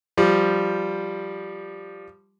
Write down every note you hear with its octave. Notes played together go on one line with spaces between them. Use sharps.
F3 G3